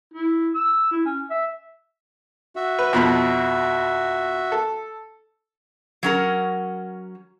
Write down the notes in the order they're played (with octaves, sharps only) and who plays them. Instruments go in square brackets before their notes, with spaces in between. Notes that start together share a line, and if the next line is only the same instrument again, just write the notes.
[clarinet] E4
E6
E4
C#4
E5
[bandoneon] F#4 E5
[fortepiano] B4
F2 B2 B5
A4
[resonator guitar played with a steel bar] F#3 C#4 A#4